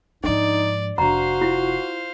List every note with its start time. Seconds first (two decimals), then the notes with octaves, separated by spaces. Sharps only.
0.24 G#2 F3 D4 D#4 D5
0.98 F1 D4 F#4 C5 F5 A#5
1.41 E4 F4